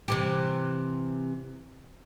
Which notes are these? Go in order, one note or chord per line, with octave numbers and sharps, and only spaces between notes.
C3 E3 G4